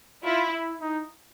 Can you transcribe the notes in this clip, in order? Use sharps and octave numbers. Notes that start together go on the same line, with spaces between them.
E4 F4
E4
D#4